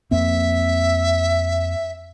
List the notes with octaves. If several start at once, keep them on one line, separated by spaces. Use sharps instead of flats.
F2 A#3 C4 E5